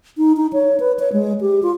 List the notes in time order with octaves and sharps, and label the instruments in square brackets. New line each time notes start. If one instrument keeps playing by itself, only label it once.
[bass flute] D#4
D#4
C#5
B4
C#5
G#3
G4
F4